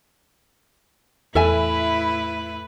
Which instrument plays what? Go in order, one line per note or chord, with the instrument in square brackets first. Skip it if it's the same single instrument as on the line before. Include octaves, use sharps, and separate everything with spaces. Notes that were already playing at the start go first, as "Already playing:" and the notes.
[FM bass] E2 [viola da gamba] A2 A3 B4 [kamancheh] E4 [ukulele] A4 E5 G#5